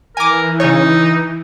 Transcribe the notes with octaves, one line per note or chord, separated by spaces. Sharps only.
E3 A#4 G#5 D6
C#3 D#4 C#5